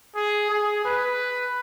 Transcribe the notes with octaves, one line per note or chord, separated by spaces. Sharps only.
G#4
G#4
B4